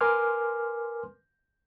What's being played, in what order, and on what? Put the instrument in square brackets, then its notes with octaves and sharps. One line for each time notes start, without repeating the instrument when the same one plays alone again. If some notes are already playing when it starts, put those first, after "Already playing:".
[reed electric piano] A#4 B4 G#5 C6 D6 F6